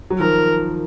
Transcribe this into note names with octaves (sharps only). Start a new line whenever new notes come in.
F#3
D#3 F3 A#4